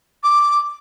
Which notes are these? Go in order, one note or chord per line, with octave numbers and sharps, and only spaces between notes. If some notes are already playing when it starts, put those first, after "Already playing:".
D6